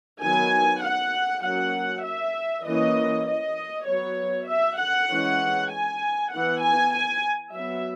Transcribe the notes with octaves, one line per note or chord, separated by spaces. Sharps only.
D#3 F#3 B3 G#5
F#5
F#3 A#3 C#4 F#5
E5
E3 A#3 C#4 D#5
D#5
F#3 B3 C#5
E5
F#5
E3 G#3 C#4
G#5
E3 B3 F#5
G#5
G#5
F#3 B3 E5